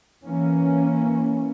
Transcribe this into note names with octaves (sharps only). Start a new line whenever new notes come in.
E3 A#3 C#4